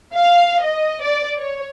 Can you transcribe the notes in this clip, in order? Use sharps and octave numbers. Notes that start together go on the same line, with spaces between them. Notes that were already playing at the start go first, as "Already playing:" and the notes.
F5
D#5
D5
C#5